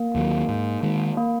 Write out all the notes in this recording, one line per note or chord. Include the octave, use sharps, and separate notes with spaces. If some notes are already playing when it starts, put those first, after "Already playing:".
Already playing: A#3
D#2 D#3 F#3
G#2
D#3 G#3
A#3